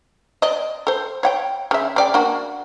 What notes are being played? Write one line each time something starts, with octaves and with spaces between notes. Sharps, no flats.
D5 D#5
A4 C5
C#5 F#5 G5
C#3 E5
C#3 D5 G5
A#3 D4 F#4